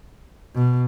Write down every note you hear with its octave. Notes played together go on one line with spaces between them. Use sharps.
B2